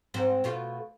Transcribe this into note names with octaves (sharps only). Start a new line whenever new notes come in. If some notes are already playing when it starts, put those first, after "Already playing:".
G#2 C4
B2 A3 F4